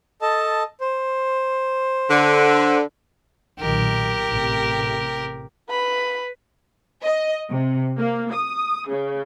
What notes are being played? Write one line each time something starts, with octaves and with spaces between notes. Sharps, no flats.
A4 D#5 A5
C5
D3
B1 A#2 D#3 G4 A#4
A1 A2 C3
B4 B5
D#5
C3
A#3
D#6
C#3